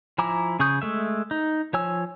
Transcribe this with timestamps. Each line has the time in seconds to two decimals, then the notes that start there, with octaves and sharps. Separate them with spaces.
0.18 F3 E4 G#5 A#5 D6
0.60 C#3 G#4 C#6 D#6 G6
0.82 G#3 A3 E5
1.31 D#4
1.73 F3 C#5 G#5 E6